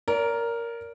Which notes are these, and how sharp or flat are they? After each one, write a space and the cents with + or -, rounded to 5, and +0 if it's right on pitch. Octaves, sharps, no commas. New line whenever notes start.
A#4 +0 D5 -45